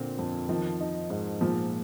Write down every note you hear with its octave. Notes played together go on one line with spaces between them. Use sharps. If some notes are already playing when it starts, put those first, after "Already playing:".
Already playing: A#2 D3 C4
F2
D#3 F3
D#4
G#2
A#2 F3